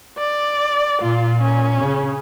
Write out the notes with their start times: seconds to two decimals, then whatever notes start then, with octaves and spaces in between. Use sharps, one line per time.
0.18 D5
1.01 A#2 F4
1.41 C#4
1.81 C#3